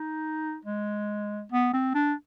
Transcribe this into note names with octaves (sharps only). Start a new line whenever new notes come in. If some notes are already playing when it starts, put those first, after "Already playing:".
Already playing: D#4
G#3
B3
C4
D4